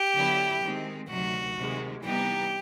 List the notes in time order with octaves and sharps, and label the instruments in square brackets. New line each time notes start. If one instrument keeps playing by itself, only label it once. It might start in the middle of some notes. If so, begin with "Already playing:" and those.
Already playing: [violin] G4
[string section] D3 F#3 B3 E4
D#3 G#3 C4
[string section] D2 C3 D#3 F#3 [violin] F#4
[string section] C3 D#3 G#3
[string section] C3 E3 G3 B3 D#4 [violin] G4